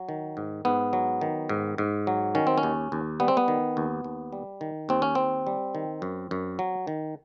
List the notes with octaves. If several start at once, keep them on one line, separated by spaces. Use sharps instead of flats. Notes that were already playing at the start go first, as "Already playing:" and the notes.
Already playing: F#3
D#3
G#2
G#2 B3
F#3
D#3
G#2
G#2
F#3
D#3 C#4
C4
C#4
D#2
D#2
G3 B3
C4
B3
D#3
D#2
D#2
G3
D#3
D#2 C4
C#4
D#2 C4
G3
D#3
F#2
F#2
F#3
D#3